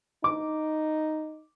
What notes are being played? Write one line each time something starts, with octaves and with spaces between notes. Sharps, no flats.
D#4 D6